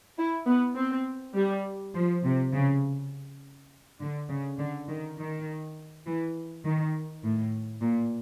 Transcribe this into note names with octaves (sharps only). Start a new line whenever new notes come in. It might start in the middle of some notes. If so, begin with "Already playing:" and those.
E4
B3
C4
G3
F3
C3
C#3
D3
C#3
D3
D#3
D#3
E3
D#3
A2
A#2